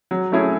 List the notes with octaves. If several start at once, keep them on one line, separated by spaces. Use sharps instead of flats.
F#3
A3 C#4 E4 G#4